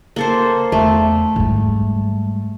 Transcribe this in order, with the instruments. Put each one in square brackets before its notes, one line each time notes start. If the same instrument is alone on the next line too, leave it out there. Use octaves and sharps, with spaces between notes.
[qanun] A#3 A4 C5
[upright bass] E2 [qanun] A3
[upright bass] G#2 G3